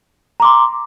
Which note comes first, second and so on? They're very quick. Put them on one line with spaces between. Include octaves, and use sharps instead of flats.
A#5 D6 C6